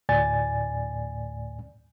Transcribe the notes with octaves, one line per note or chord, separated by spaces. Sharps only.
D2 A2 D5 G#5 A6